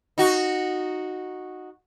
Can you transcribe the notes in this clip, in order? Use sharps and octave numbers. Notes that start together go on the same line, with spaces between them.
D#4 F#4